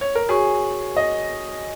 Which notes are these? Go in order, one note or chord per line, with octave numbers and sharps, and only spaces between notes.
C#5
A#4
F#4 G#4 C#5 G#5 C#6
D#5